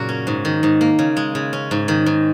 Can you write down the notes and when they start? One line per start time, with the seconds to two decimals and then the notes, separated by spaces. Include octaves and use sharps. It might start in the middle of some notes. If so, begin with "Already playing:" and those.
Already playing: F#2 A#2 C#3 A#3 F#4
0.09 C#4
0.27 G#2
0.45 D#3
0.63 G#2
0.81 A#3
0.99 C#3
1.17 G#3
1.35 C#3
1.53 C#4
1.71 G#2
1.88 D#3
2.06 G#2